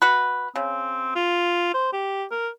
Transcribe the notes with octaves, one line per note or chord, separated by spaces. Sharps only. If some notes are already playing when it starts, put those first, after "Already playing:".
F#4 B4
C#3 C4
F4
C5
G4
A#4